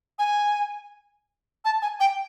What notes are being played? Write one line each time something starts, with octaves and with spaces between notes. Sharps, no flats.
G#5
A5
G#5
G5